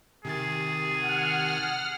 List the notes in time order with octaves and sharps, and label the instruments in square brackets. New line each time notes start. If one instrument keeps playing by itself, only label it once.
[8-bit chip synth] C3 D#3 A6 [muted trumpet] G#4
[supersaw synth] F#5 F6